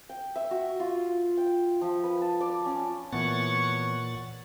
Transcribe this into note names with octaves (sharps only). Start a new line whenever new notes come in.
G5
E5
F#4
F4
G5
F3
B4
A5
D5
C#4
A#2 E3 B3 C#5 F#5 C#6 A6